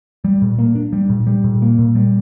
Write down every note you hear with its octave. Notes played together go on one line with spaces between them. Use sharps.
G3
A#2
A#3
D4
G3
A#2
G3
A#2
A#3
A#2
G3